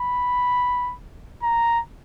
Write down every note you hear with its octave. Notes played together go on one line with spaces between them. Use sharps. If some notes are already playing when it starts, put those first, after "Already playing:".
Already playing: B5
A#5